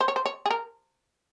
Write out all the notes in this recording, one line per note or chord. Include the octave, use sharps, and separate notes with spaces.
C5
C#5
C5
C#5
G#4
A#4